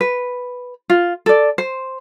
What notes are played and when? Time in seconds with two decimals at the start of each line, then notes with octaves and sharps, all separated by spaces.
0.01 B4
0.90 F4
1.26 A4 D5
1.58 C5